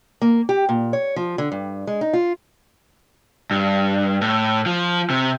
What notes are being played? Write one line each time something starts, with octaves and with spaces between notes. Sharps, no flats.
A#3
G4
A#2
C#5
F3
D3
G2
G#3
D#4
F4
G2
A2
F3
C3